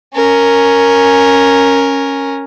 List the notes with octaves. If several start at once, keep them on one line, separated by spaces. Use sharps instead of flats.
C#4 A#4